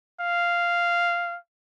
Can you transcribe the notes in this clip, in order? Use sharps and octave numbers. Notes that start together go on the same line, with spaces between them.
F5